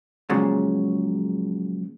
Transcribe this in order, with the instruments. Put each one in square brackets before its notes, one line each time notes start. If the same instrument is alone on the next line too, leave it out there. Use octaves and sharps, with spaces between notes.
[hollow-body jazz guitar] A#2 C#3 F3 F#3 G#3